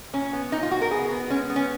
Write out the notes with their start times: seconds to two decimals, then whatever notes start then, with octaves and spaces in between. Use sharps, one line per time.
0.13 A#2 C#4
0.33 B3
0.52 A#2 D#4
0.63 F4
0.71 B3 F#4
0.82 A#4
0.91 B3 G#4
1.11 B3
1.30 G#3 C#4
1.50 B3
1.56 C#4